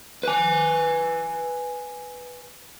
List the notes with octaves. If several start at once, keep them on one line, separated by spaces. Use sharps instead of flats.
B4 G#5